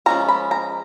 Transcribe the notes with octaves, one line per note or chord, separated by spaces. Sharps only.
F3 G#3 C#4 A#5
B5
A#5